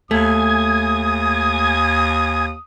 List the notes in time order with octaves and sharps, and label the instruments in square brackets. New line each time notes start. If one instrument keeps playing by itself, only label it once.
[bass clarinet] D#2 [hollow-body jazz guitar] A3 [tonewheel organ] G#5 G#6 [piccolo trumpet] D#6